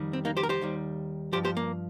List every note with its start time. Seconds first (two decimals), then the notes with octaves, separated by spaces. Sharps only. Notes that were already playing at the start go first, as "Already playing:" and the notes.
Already playing: F2 D#3 G3
0.13 C4
0.25 A#3 D#4
0.37 G4 C5
0.43 A#4
0.49 G4 C5
0.61 D#2 D#3 G3
1.32 G2 F3 G4 C5
1.45 G4 C5
1.57 A#3